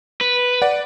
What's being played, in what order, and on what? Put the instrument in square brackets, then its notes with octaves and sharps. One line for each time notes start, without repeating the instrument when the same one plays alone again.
[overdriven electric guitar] B4
[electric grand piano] D5 F#5